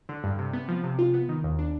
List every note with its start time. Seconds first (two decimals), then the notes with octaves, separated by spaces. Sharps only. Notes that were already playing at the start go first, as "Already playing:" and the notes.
0.09 D3
0.24 G2
0.39 C3
0.53 B3
0.69 F3
0.84 C3
0.99 F4
1.14 B3
1.29 D#3
1.44 D#2
1.59 D4